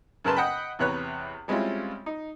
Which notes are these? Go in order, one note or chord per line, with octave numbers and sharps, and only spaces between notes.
F#2 C#3 A#4 B4 A5 C6
D#5 F#5 G5 B5
E2 C3 B4 C#5 A#5 F#6
G3 G#3 C4 C#4 E4 F4
D#4